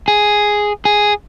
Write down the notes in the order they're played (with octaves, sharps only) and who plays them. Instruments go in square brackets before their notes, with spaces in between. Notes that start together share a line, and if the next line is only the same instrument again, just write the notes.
[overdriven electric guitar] G#4
G#4